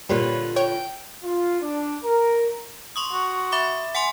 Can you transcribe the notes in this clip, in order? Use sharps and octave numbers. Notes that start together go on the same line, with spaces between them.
A#2 D3 G3 F4 B4 C#5
C#5 G5
F4
D4
A#4
C6 C#6 D#6
F#4
E5 B5 D6
F#5 G#5 C6